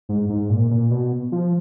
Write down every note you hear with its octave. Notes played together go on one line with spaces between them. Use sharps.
G#2
G#2
A#2
A#2
B2
F3